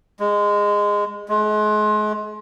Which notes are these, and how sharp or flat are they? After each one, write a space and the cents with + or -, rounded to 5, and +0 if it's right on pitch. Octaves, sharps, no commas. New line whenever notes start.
G#3 -15
G#3 +35